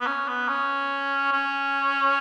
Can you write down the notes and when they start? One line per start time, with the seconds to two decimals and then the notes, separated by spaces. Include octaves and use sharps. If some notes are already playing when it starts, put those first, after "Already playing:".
0.01 B3
0.07 C#4
0.28 B3
0.49 C#4
1.32 C#4